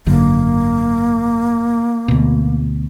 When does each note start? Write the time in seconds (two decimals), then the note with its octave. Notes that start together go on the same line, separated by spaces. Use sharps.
0.06 G#1 F#2 D3 A#3
2.08 D2 B2